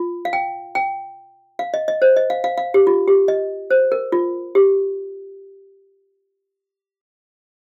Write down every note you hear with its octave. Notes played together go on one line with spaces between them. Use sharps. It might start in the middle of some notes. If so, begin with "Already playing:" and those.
Already playing: F4
F5
G5
G5
F5
D#5
D#5
C5
D#5
F5
F5
F5
G4
F4
G4
D#5
C5
A#4
F4
G4